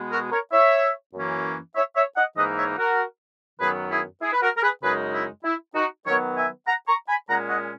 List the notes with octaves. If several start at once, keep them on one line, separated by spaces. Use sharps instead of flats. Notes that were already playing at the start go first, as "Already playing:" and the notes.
Already playing: B2 G#3 B3
F#4 A#4
A#4 C#5
C#5 E5
F#2 E3 A#3 C#4
C#5 E5
C#5 E5
D#5 F#5
G#2 E3 A#3 D#4 B4 D#5
C#5 E5
F#4 A#4
F#2 D#3 F#3 B3 G#4 B4
E4 G#4
E4 G#4
B4
F#4 A#4
A#4
G#4 B4
F#2 C#3 G#3 D#4 G#4 B4
E4
E4
D#4 F#4
D#3 F#3 B3 A#4 C#5
E5 G#5
F#5 A#5
A#5 C#6
G#5 B5
A#2 G#3 C#4 F#5 A#5
D#5 F#5